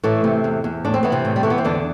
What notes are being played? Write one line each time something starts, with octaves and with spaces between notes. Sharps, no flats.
A2 E3 A3
C3
E2
E2
A2 D4
C4
E3 B3
C3 C4
A2
G3
E3 A3
B3
C4
E2 D3 D4